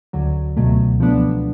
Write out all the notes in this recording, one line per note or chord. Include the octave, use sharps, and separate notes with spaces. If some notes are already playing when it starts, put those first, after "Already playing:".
D2 D3 F#3
C#2 B2 F#3 A3
F3 B3 D4